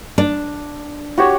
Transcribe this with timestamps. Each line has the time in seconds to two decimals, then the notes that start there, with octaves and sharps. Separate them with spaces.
0.18 D4
1.17 F#4 G4 C#5